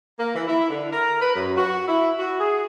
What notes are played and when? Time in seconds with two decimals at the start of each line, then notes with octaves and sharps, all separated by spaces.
0.19 A#3
0.35 E3
0.47 E4
0.69 D3
0.92 A#4
1.21 B4
1.34 F#2
1.57 F#4
1.87 E4
2.19 F#4
2.39 G#4